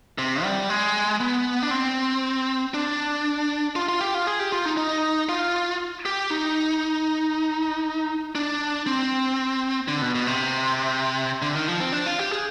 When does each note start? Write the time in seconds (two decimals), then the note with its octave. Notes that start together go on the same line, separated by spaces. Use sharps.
0.18 C3
0.43 G3
0.70 G#3
1.20 B3
1.63 D4
1.71 C4
2.74 D4
3.76 F4
3.89 F4
4.01 G4
4.14 F4
4.27 G#4
4.39 G4
4.52 F4
4.66 D#4
4.77 D#4
5.29 F4
6.06 G4
6.30 D#4
8.35 D4
8.86 C4
9.88 D3
10.02 B2
10.15 B2
10.27 C3
11.42 D3
11.55 D#3
11.68 F3
11.80 C4
11.93 D4
12.06 F4
12.19 G4
12.31 G#4